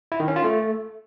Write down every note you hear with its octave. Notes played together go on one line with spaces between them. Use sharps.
E4
D#3
C#4
F4
A3